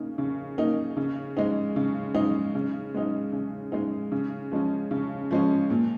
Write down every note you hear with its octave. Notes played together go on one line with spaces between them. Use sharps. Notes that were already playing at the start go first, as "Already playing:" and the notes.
Already playing: C#3 A#3 D#4
C#3
A#3 D#4
C#3
G#3 D#4
C#3
G#3 D#4
C#3
G#3 D#4
C#3
G#3 D#4
C#3
F3 G#3 C#4
C#3
F3 G#3 C#4
A#2